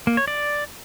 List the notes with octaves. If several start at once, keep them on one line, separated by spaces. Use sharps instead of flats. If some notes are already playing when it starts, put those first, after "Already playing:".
A#3
C#5
D5